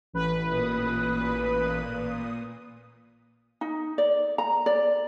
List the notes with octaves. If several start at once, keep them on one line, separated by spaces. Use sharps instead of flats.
A1 B4
A#2 D#6
D#4
D5
A#5
D5